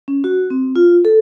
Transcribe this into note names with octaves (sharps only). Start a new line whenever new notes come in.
C#4
F#4
C4
F4
A4